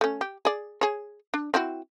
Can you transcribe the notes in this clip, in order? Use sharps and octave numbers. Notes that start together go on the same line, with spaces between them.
A3 C#4
G4
G#4 D5
G#4 C#5
D4
C4 E4 F#4